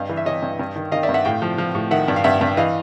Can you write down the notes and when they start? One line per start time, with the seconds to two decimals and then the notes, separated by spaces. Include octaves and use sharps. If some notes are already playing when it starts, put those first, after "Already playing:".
Already playing: G2 D#5 F5
0.09 E3
0.17 E5
0.26 E3 C#5 D#5
0.42 G2
0.59 G2
0.76 D#3
0.92 D#3 D#5 F5
1.03 D5 E5
1.09 G2
1.14 E5 F#5
1.25 A2 F5 G5
1.42 F3
1.58 F3
1.75 A2
1.91 D#3 E5 F#5
2.08 G2
2.16 F5
2.24 G2 E5 F#5
2.41 G2
2.57 E3 D#5 F5